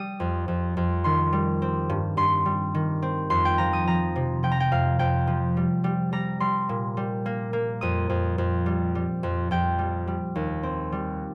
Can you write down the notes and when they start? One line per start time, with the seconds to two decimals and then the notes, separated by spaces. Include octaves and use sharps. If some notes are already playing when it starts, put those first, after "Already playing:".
Already playing: G3 D#6
0.20 F2
0.48 F2
0.77 F2
1.04 D#3 C6
1.33 G3
1.62 C4
1.89 G2
2.17 G2 C6
2.46 G3
2.75 D#3
3.02 C4
3.30 F2 C6
3.45 G5
3.58 F3 A#5
3.73 D#6
3.87 F3 A#5
4.16 C3
4.43 F3 G5
4.52 A#5
4.60 G5
4.72 F2 F5
4.99 F2 G5
5.27 F3
5.57 G3
5.84 G3
6.12 G3 A#5
6.40 G3 C6
6.69 A#2
6.97 G3
7.26 A#3
7.53 A#3
7.81 F2 D#6
8.09 F2
8.38 F2
8.66 G3
8.95 G3
9.23 F2
9.51 F2 G5
9.79 G3
10.07 G3
10.35 D#2
10.63 C4
10.92 G3